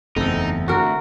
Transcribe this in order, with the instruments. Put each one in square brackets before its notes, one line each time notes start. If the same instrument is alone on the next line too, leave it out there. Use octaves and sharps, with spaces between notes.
[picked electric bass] F#1 E2 [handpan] A3 C4 A4 [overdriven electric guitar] D#4
[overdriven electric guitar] D2 [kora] F#4 A#4